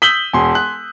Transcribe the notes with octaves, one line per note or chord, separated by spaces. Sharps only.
D#6 E6 G6 B6 F#7 G7
E1 G#5 C6
F#6